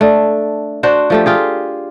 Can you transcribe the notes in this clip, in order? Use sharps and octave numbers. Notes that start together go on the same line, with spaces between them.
A3 D4
D4 F#4 C5
F3 A3 G4
F4 G4 G#4